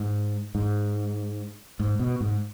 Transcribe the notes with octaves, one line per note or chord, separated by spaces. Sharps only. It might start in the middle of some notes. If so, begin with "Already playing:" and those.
Already playing: G#2
G#2
G#2
B2
G#2